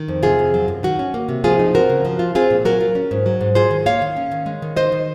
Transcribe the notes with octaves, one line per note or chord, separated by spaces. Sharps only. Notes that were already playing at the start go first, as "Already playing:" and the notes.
Already playing: D#3
F2
C3 F4 G#4
F2
F#3
F#2
D#3 F#4
C#4
A#3
C3
F3 F4 G#4
D#4
C4 F#4 A#4
C#3
F3
F4
C4 F4 G#4
A#2
F#3 F#4 A#4
F4
C#4
G#2
F#3
G#2
F4 G#4 C5
D#3
A#3 C#5 F5
D#3
C#4
D#3
G#3
D#3
D#4 C5 D#5
D#3